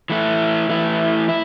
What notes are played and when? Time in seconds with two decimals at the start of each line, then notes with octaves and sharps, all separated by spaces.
0.10 E3 A3 E4
0.69 E3 A3 E4
1.29 E4